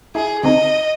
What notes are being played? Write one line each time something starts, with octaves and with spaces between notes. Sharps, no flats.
E4 G#4
D3 C4 D#4 D#5